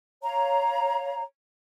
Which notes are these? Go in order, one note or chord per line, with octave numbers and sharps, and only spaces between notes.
C#5 F5 A#5